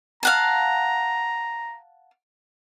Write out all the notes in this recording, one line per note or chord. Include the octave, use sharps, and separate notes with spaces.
F5 F#5 A5 A#5